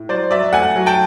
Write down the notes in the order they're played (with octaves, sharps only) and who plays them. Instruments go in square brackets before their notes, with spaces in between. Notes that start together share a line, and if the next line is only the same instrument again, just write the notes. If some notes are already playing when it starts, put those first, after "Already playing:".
Already playing: [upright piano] A2
F#3 C5 D5
F#3 D5 E5
A3 F#5 G#5
F#3
G5 A5